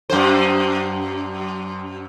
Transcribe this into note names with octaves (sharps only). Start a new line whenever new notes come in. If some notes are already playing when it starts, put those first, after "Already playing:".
F#2 C5